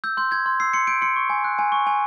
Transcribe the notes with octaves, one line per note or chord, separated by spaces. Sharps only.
E6 G6
C6 G6
G6 G#6
C6
E6 C7
C6 C#7
G6 D7
C6 C#7
C#6
G#5
F#6
G#5
C#6
G#5